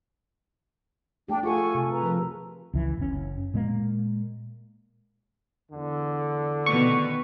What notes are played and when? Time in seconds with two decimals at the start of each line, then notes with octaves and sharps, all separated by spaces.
1.28 A3 D4 G4 G5
1.43 F4 G#4 A4 F#5 G#5 C#6
1.75 C3
1.90 B4 A#5
2.03 F3 A#4
2.74 C#2 E3
2.97 F#1 C#4
3.54 A#2 G#3 A#3
5.72 E2 D3
6.66 B2 D#3 B4 C#6